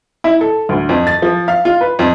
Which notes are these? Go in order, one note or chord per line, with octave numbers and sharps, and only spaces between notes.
E4
A4
D2
F2
A6
F3
F5
F4
B4
F2